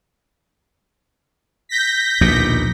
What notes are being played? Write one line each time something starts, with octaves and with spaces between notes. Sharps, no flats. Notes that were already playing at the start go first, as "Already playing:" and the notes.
G6 A#6 B6
A#1 D#2 B2